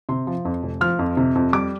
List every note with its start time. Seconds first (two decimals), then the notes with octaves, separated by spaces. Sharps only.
0.09 C3 C6
0.27 F3
0.45 F2
0.63 F1
0.81 F3 F6
0.99 F2
1.17 C3
1.35 F2
1.53 G3 D6